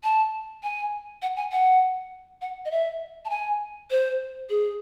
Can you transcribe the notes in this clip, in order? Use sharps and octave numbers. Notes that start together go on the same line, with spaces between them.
A5
G#5
F#5
G#5
F#5
F#5
D#5
E5
A5
G#5
C5
G#4